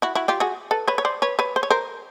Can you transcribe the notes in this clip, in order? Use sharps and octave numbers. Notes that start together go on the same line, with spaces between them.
E4 F#4
E4 F#4
F4 G4
F#4 G#4
A4 B4
B4 C#5
C#5
C5 D5
B4 C#5
B4 C#5
C5
C#5
A#4 C5